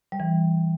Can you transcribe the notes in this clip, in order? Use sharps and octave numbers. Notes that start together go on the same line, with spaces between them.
G3
E3